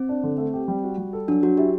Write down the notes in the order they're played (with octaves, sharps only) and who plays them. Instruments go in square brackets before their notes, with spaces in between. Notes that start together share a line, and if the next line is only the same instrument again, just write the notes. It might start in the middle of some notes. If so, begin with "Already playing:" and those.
Already playing: [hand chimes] C4
[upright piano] D4
D3
A3
G4
G3
F#4
G3
A4
[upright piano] F#3 [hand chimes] D4
[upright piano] F#3 [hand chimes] F#4
[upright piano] E4 [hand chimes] G4